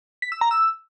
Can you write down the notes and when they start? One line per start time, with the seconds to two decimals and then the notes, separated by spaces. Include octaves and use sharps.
0.22 B6
0.32 E6
0.41 A#5
0.51 E6